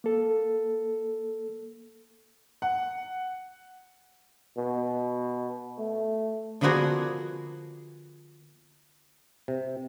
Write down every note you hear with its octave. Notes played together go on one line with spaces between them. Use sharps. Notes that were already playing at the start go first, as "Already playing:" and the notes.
A#3 A4
F#5
B2
A3
D3 F3 A#3 B3 F#4 G#4
C3